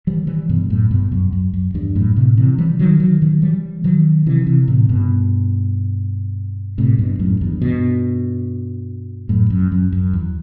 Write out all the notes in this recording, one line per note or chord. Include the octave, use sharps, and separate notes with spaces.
E3 G3
E3 G3
G2 B2
F#2 A2
G2 B2
F#2
F#2
F#2
E2 G2
F#2 A2
A2 C3
C3 E3
E3 G3
D#3 F#3
D#3 F#3
D#3 F#3
E3 G3
D#3 F#3
C3 E3
C3 E3
A2 C3
G2 B2
A2 C3
G2 B2
F#2 A2
E2 G2
G2 B2
F#2 A2
F#2
F#2
F#2
E2